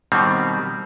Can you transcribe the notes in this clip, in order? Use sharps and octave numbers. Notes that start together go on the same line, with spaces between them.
B2 D#3 G3 C4